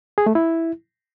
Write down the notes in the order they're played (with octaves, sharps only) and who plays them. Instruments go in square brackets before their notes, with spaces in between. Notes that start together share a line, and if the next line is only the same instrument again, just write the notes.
[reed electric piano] G#4
A3
E4